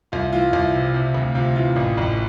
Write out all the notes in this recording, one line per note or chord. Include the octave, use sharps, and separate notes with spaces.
C2 F4
E3 F4
C2
C3
C3
D2
C3 F4
E3 F4
A1
A1